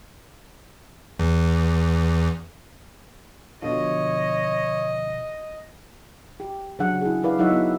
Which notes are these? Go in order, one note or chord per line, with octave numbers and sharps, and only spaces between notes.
E2
B2 D3 F3 C#5 D#5
G4
C#3 F#3 D4 F#5
E4 G#4
E4 B4 D5 F5
F#3 D#4 E4 C#5 E5 F#5
B3 E4